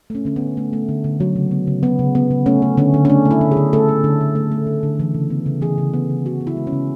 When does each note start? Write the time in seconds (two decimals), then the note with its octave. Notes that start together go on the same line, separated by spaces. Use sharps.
0.10 A3 C#4
0.25 D3 C#4
0.36 B3
0.41 D3
0.57 A3
0.73 A3
0.89 D3
1.04 D3
1.20 F#3
1.36 C#3
1.51 B3
1.67 C#3
1.83 F#3 B3
1.99 C#3
2.15 B3
2.31 C#3
2.46 A3 C#4
2.62 A3
2.78 D3 C#4
2.94 D3
3.05 C#4
3.09 A3 D4
3.25 A3
3.31 E4
3.41 D3
3.51 G#4
3.57 D3
3.73 A3 A4
3.89 A3
4.04 D3
4.21 D3
4.35 A3
4.52 A3
4.67 D3
4.83 D3
5.00 E3
5.14 C#3
5.30 B3
5.46 C#3
5.62 E3 G#4
5.78 C#3
5.94 B3
6.10 C#3
6.25 E3 F#4
6.41 B3
6.47 E4
6.57 G#3
6.67 C#4
6.73 C#3